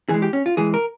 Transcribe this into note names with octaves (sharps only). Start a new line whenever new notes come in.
E3 G#3 G#4
G4
C#4
F4
E3 G#3 G#4
A#4